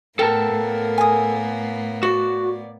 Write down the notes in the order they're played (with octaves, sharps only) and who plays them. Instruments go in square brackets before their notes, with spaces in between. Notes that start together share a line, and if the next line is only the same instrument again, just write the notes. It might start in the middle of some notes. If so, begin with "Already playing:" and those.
[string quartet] A2 A#3 B3 [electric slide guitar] A4 A#4 A5 [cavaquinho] G5
[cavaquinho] G#5 D#6
[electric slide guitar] F#4 [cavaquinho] D5